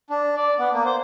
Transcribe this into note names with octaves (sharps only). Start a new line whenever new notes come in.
D4
D5
B3
A#3
C5